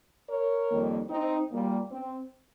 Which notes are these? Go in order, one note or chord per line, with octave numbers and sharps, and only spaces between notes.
A#4 C#5
F2 D#3 G3 A#3
C4 D#4
A#2 G3 A#3
C4